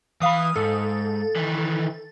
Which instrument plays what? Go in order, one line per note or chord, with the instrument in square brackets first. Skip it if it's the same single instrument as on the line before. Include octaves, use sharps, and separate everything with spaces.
[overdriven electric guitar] E3 B5 [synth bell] F5 D#6
[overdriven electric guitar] G#2 [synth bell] A4
[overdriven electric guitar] D#3 E3